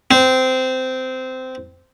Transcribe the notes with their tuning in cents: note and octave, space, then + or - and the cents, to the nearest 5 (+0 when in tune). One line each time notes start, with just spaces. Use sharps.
C4 -15